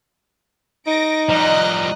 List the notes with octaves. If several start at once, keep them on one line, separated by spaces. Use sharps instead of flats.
D#4 A#6 D7
F3 G3 D#5 A#5 F#6